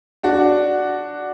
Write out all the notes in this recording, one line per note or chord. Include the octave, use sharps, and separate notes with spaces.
D4 F#4